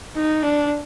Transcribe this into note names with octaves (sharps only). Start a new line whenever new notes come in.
D#4
D4